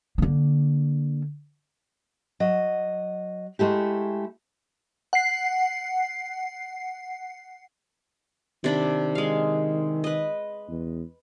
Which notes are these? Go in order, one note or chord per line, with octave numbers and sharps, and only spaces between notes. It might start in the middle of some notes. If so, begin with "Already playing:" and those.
D3 A#3
F#3 D#5
G#3 A3 E4 G4
F#5 C7
C3 D#3 D4 B5
G#3 F5
B4 D#5
E2